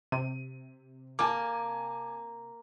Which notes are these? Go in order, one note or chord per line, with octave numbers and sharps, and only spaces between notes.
C3 D#7
A#3 G#5 A5 D6